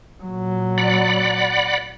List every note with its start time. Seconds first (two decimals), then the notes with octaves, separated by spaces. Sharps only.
0.23 A#2 F#3
0.78 D5 F#5 B5